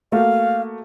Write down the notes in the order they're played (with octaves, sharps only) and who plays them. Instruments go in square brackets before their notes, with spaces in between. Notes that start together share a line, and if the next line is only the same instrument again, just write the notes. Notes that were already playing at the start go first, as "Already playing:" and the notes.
[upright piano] A3 A#3 F#4 [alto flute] F5